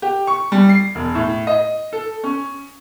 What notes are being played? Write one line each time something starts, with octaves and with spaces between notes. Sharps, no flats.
G4
C#6
G3
C7
E1
A2
D#5
A4
C#4